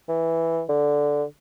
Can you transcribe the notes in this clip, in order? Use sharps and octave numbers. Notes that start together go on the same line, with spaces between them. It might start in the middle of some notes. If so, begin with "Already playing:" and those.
E3
D3